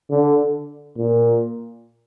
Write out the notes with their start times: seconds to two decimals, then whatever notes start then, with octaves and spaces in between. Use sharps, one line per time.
0.10 D3
0.97 A#2